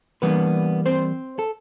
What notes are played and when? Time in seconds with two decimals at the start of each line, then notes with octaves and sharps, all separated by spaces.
0.22 E3 G3 A#3 B3 D4 B4
0.86 C4 C5
1.39 A4